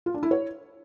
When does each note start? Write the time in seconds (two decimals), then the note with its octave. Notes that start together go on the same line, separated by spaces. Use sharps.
0.06 F4
0.14 D4
0.23 E4
0.31 C#5